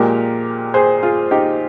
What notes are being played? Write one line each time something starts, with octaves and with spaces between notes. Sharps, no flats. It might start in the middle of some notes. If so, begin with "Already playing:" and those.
Already playing: A#2 F3 G#3 G4 A#4
G#4 C5
F4 G#4
D#4 G4